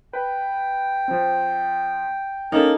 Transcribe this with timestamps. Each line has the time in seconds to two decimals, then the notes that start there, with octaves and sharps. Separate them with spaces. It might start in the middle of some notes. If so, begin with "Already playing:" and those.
0.13 B4 G5
1.08 F3 C4
2.52 A#3 C#4 D#4 A4